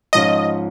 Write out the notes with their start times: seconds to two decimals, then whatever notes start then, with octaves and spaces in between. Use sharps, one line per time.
0.13 G#2 F3 C#4 F4 D#5